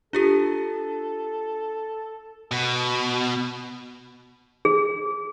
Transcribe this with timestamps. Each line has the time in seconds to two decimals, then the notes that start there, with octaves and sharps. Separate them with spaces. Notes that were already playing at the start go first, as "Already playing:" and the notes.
0.13 D4 F4 G4 A4
2.52 B2
4.65 G#4